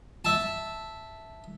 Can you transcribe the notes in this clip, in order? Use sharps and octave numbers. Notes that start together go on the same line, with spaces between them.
E5 A5